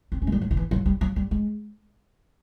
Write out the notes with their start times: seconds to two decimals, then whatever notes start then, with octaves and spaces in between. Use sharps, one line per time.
0.12 C4
0.22 C#4
0.27 G#3
0.32 G3
0.41 F#3
0.51 D#3
0.57 E3
0.71 F#3
0.86 G3
1.01 F#3
1.16 G3
1.31 G#3